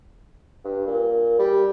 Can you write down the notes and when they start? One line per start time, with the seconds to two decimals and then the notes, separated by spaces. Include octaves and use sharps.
0.64 G2
0.87 A#2
1.39 G3